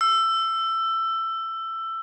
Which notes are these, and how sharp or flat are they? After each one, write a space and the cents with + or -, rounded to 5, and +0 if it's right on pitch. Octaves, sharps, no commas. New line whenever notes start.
E6 +15